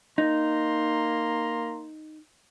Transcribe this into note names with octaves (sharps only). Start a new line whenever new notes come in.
A#3 D#4 A#5 C6